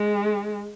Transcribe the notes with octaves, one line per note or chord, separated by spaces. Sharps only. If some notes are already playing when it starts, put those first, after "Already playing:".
Already playing: G#3